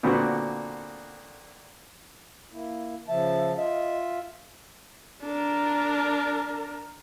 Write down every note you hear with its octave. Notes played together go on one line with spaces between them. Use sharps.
A#2 D3 B3 C4 F#4
A#3 E4
C#3 F3 E5 A5
F4 D#5 E5
D4 A#4